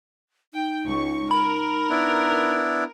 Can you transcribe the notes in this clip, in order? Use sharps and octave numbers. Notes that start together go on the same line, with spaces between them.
D#4 G5
C#2 C#6
A#4 B5
B3 D4 E4